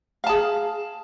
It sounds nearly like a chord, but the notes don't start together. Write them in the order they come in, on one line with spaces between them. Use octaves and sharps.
F5 A5 G#4